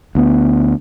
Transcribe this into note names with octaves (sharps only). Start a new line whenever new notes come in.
D2 B3